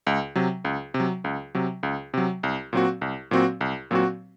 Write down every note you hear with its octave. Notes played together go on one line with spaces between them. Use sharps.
C#2
C3 F#3
C#2
C3
F#3
C#2
C3 F#3
C#2
C3 F#3
C2
A#2 F#3 C4 F#4
C2
A#2 F#3 C4 F#4
C2
A#2 F#3 C4 F#4